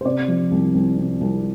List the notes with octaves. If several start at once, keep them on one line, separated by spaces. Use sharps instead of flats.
C5
C3 D5
F3
C2
C2
C3
C2